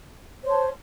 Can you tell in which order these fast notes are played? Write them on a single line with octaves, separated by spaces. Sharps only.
C5 C#5 C6 A5